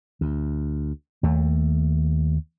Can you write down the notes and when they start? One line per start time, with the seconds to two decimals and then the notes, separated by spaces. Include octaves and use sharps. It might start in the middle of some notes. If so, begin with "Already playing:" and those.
0.21 D2
1.23 D#2 A3